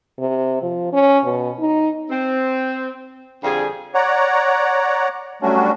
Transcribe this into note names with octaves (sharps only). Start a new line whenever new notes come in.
C3
F3
C#4
B2
D#4
C4
F2 D3 G3 G#4
C#5 D5 F#5 A#5
F#3 G3 A3 C#4 D4 F#4